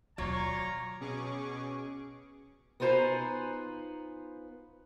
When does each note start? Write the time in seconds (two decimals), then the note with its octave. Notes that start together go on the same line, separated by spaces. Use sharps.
0.18 D#2 B2 F#3 F4 C#5 D5 A#5
1.00 B2 C#4 G#4 C#6 D6
2.80 B3 D#4 F4 C5 G#5 A#5